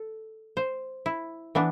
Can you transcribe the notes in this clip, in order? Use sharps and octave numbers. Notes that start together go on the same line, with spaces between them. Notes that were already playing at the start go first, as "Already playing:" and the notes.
Already playing: A4
C5
E4
E3 B3 D4